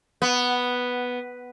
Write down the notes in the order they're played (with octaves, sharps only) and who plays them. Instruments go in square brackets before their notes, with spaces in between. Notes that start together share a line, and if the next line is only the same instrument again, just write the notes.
[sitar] B3